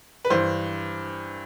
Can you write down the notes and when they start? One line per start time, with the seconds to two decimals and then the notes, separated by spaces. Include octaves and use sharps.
0.25 B4
0.30 G2 E3 C5